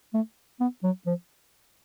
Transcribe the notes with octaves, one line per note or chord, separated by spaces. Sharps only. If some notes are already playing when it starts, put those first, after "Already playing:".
A3
B3
F#3
F3